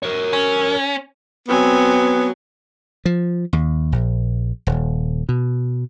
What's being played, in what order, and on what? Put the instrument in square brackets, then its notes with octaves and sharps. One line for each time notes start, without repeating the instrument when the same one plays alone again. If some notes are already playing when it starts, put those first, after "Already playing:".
[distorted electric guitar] A#4 C#5
[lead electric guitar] C#4
[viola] F#3 [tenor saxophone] B3 [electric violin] C4 G#5
[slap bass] F3
D#2
A#1
D#1
B2